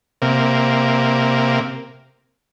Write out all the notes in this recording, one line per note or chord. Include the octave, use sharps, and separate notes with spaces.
C3 A#3